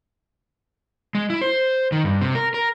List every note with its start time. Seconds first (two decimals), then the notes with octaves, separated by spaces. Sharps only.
1.15 G#3
1.30 E4
1.42 C5
1.92 D#3
2.04 G2
2.21 C3
2.35 A#4
2.54 A#4